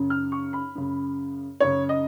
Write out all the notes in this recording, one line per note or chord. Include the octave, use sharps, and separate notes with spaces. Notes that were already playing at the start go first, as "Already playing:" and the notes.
Already playing: F#2 C#3
F6
C#6
B5
F#2 C#3
F#2 C#3 C#5
D#5